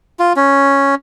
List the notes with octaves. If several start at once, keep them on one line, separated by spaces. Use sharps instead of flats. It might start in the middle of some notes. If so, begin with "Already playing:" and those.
F4
C#4